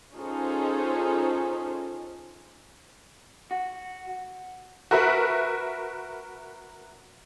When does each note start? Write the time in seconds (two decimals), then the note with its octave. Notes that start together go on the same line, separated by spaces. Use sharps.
0.15 C#4 D#4 F4 G#4 A4 C5
3.51 F#4
4.91 F#4 A#4 B4 E5